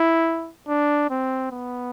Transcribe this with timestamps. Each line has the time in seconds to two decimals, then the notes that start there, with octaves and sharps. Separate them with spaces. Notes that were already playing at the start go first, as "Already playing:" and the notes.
Already playing: E4
0.68 D4
1.10 C4
1.51 B3